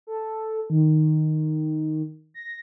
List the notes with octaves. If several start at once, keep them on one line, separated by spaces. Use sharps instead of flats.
A4
D#3
A#6